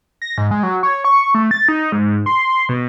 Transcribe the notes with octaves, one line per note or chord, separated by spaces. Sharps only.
A#6
G#2
G#3
F#3
C#5
C#6
A3
A6
D#4
G#2
C6
B2